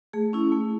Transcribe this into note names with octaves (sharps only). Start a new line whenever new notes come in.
A3 G#4
C#4 E4
A3